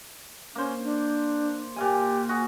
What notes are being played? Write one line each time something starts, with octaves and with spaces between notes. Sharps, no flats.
A#3 C#4 C5
D4
A#2 G4 F5 G#5
F#4 G#4